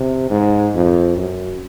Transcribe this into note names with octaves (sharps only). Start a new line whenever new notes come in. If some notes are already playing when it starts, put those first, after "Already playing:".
Already playing: C3
G#2
F2
F#2